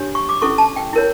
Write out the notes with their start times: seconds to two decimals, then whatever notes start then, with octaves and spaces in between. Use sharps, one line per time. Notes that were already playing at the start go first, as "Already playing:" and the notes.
Already playing: D4 G4 C#5
0.15 C#6
0.29 D6
0.42 C#4 E4 A4 C#6
0.58 A5
0.76 G5
0.93 E4 A#4 C#5